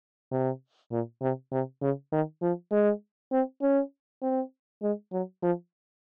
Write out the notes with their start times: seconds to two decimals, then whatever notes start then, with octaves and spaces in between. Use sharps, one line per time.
0.31 C3
0.92 A#2
1.21 C3
1.52 C3
1.82 C#3
2.12 D#3
2.42 F3
2.72 G#3
3.32 C4
3.62 C#4
4.22 C4
4.83 G#3
5.12 F#3
5.43 F3